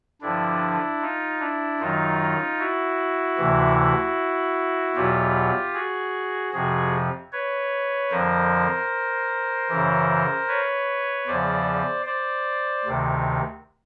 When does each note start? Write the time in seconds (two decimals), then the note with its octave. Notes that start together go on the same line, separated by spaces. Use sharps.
0.21 G2 D3 F3 D4 E4
1.01 D#4 F4
1.40 D4 E4
1.79 F#2 D#3 F#3 D#4 F4
2.59 E4 F#4
3.38 D2 C3 E3
4.95 E2 B2 F#3 F4 G4
5.74 F#4 G#4
6.53 F2 C3 F3 F#4 G#4
7.32 B4 C#5
8.11 F2 D3 F3 A#4 C5
9.69 F#2 C#3 E3
10.48 B4 C#5
11.27 E2 C#3 F3 C5 D5
12.06 C5 D5
12.85 D2 C3 D#3